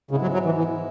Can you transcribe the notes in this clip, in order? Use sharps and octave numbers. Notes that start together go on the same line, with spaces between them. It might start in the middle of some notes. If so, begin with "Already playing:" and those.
G#2 C#3 G#3 B3 E4
F#3
F#3
E3
E3